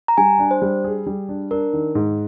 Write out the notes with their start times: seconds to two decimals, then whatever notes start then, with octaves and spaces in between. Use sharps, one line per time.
0.08 A#5
0.18 G3 G#5
0.39 D4
0.51 C5
0.62 G3
0.84 G#4
1.07 G3
1.29 D4
1.51 D4 A#4
1.73 D#3
1.95 G#2